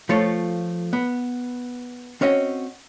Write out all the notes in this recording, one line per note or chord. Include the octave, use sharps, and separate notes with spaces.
F3 A3 F4 A4 C#5
B3
C4 C#4 F#4 D#5